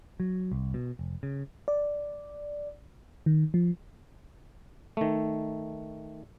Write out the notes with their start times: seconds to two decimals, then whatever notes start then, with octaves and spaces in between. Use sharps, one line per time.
0.20 F#3
0.52 C2
0.74 B2
0.99 F1
1.23 C#3
1.68 D5
3.26 D#3
3.54 F3
4.97 D#3 A3